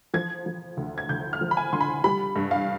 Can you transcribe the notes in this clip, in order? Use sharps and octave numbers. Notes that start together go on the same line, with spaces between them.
F3 G#6
F3
D2
G#6
D2 G6
F6
F3
B5
G#5
D3 C6
B5
G3 B5
G2
F5